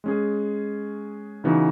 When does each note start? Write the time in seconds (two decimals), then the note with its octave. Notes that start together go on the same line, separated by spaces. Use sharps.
0.04 G#3 C#4 G#4
1.44 C#3 E3 B3 D#4 F#4